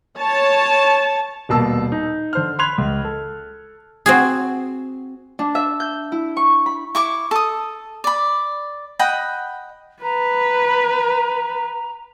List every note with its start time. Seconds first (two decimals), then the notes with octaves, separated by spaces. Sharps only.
0.18 C#5 A5
1.49 D#1 B2 A#3 A5 E6
1.92 D#4
2.33 D3 C5 F6
2.59 B5 C6 F#6 G#6 F7
2.78 C#2
3.04 A4
4.06 C4 F#4 G#4
5.39 D4
5.55 E5
5.80 G6
6.12 E4
6.37 C#6
6.66 B5
6.95 E4 C#6 D6
7.31 A4 D#6
8.04 D5 B5
8.99 D#5 F#5 G5 B5
10.03 B4 A#5